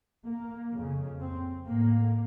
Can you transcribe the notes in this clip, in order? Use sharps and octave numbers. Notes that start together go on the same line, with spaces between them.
A#3
F2 C#3
C4
A2 A#3